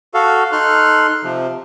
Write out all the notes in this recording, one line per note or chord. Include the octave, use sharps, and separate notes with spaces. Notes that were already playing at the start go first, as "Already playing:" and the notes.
F#4 A4 F5
D#4 A4 C6 F6 F#6
C3 F3